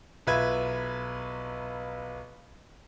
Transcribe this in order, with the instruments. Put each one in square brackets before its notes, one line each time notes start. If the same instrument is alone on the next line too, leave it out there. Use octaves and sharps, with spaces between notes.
[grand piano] B1 F4 B4 E5 G#6